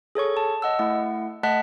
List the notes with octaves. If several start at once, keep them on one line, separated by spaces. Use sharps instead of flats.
G#4 A4 C#5 C#6
A5
D#5 F#5 E6
A3 E4 F#5
A3 D#5 F#5 A5 F#6 B6